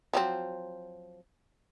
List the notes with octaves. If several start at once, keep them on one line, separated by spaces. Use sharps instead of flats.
F3 F#3 C4